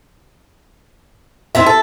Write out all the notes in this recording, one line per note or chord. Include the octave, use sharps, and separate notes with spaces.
D#3 C4 E4 E5
A4